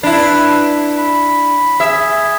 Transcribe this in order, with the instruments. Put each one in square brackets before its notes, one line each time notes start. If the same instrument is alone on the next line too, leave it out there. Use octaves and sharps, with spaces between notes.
[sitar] D4 E4 [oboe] B4
[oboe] B5
[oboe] G#4 [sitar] E5